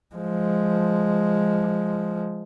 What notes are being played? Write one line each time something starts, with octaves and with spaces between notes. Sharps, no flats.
F3 G#3